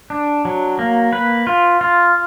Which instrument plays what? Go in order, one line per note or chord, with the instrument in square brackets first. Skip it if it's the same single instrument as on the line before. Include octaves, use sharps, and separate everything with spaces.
[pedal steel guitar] D4
F#3
A#3
B4
F4
F4